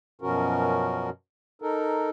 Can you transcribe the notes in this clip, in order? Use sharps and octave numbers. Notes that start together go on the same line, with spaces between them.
F#2 B2 F3 C#4 F#4 A#4
D#4 A4 A#4